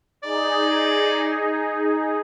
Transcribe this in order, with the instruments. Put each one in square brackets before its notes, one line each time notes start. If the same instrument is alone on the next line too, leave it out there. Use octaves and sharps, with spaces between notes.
[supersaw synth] D#4 G#4 [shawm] D5